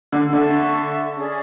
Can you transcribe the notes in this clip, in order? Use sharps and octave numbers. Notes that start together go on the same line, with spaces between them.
D3
D3 A4 E5 A5 C#6
C#4 G#4 D5